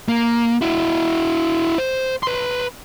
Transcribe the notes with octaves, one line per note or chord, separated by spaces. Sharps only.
A#3
E4 F#4
C5
B4 C6